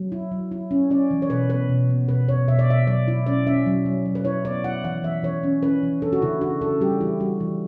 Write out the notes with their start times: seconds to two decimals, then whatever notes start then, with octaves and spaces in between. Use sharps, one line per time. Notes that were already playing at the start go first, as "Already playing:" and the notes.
Already playing: F#3
0.12 E4
0.32 F#3
0.52 E4
0.71 C#4
0.91 C#4 D5
1.11 E3
1.22 C#5
1.30 B2 B4
1.50 B3 B4
1.69 B2
1.89 B3
2.09 B2 B4
2.29 B2 C#5
2.48 B2 E5
2.59 D5
2.68 B2 E5
2.87 F#3 D5
3.08 E4
3.26 C#4 D5
3.47 C#4 E5
3.66 F#3
3.85 F#3
4.06 F#3
4.15 B4
4.25 E4 C#5
4.45 B3 D5
4.64 E4 F#5
4.84 E3 F#5
5.04 E3 E5
5.23 E3 C#5
5.43 C#4
5.63 C#4 B4
5.83 E3
6.02 D4 A4
6.13 F#4
6.22 C#3 E4
6.41 D4 F#4
6.61 C#3 A4
6.80 G3 G4
7.01 E3 E4
7.20 G3 F#4
7.40 E3